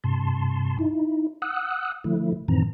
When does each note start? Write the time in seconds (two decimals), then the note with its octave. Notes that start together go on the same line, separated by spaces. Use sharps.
0.04 G2 C3 A5 C6
0.79 D#4 E4
1.42 F#5 D#6 E6 F#6
2.04 D3 F3 A3 E4
2.48 F#2 A2 D#3 E3 C4 A#5